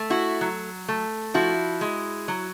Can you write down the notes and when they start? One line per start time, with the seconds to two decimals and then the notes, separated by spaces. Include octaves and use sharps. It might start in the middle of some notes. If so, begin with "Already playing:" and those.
Already playing: A3
0.10 E4 F#4
0.41 F#3
0.88 A3
1.34 F3 E4 F#4
1.81 G#3
2.28 F#3